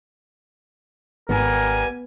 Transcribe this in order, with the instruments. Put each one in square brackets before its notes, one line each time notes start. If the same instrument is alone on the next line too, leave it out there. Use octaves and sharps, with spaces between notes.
[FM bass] G#1 [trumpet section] G3 G#5 [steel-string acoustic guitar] B3 [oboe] A#4